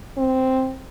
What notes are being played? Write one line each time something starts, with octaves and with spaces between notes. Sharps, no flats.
C4